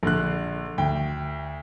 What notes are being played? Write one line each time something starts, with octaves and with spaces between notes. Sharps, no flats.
A#1 D3 F#6
D2 G5